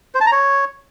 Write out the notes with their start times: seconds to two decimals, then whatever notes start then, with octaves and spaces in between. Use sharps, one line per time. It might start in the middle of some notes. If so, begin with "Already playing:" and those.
0.15 C5
0.21 A5
0.26 A#5
0.32 C#5